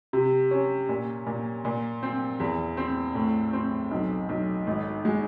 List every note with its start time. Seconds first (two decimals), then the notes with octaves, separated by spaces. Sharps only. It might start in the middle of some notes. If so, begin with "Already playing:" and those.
0.13 C3
0.51 C#4
0.89 A#2
1.27 A#2
1.65 A#2
2.03 C4
2.40 E2
2.77 C4
3.15 A2
3.53 C4
3.91 B1
4.29 B1
4.67 G#1
5.05 G#3